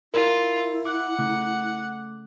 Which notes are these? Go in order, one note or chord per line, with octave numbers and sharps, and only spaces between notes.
E4 F4 A#4
F#5 D6 F#6
C#3 A3 D6 F#6